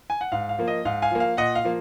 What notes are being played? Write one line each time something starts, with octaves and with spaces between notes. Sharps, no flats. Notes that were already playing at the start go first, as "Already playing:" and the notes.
G#5
F#5
G#2 F5
F5
F3 A#3
D#5
G#2 F5
F5 G#5
F3 A#3
F5
A#2 D#5 F#5
F5
F3 A#3